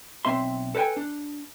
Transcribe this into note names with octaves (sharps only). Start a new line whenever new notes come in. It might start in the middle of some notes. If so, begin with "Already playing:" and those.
B1 C4 E5 C6
A4 B4 C5 G5 G#5
D4